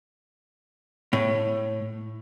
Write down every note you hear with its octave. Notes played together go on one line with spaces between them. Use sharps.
A2